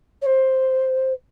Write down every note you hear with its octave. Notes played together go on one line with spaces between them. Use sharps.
C#5
C5